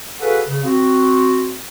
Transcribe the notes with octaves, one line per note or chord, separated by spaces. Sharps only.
F#4 G#4 A4 B4 F5 F#5
C#3
C4 F#4